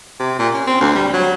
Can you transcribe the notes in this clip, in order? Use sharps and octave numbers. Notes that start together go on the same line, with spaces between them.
C3
A#2
C#4
C4
D2
G3
F#3